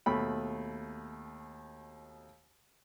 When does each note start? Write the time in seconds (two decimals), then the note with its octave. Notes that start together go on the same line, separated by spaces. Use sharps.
0.06 D#2 B2 A3 B5